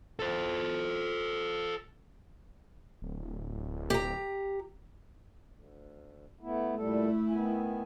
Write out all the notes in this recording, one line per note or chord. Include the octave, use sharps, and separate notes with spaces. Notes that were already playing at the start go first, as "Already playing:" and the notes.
A4 C5
D1
G4 A#5
D2
A3 B3 E4
A#2 G3 A3 E4 A4
D#3 B3 G#5